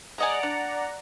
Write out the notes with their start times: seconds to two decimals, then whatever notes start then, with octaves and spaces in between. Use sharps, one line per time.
0.18 G#3 D5 D#5 F#5 G#5 A#5
0.43 D4